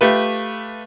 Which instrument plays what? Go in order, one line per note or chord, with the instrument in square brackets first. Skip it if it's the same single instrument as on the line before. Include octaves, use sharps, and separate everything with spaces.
[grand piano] A3 F4 G4 B4